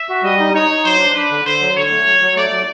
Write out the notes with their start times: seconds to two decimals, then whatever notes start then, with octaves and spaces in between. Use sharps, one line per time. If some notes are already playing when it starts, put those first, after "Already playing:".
Already playing: E5
0.09 F#4
0.23 G3 D#5
0.39 D#4
0.53 D#4 C#5
0.69 D#4
0.84 F#3 C5
0.99 D4
1.15 D4 B4
1.31 D3
1.45 D3 C5
1.61 F#3
1.75 D3 C#5
1.90 A3
2.06 F#3
2.21 F#3
2.36 A3 D5
2.51 F#3